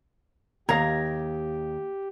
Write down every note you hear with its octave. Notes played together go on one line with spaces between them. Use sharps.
D#2 G4 F5 A#5 G#6 A#6